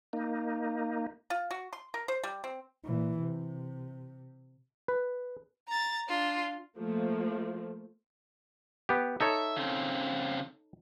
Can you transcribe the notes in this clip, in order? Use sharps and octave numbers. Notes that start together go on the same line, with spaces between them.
A#3 D#4
F4
F#4
C6
A#4
C5
G3
C4
A#2 E3
C3
B4
A#5 A6
D4 F4
F3 A3 A#3
B3 G4
D#4 A4 C#5 E5
C#3 C4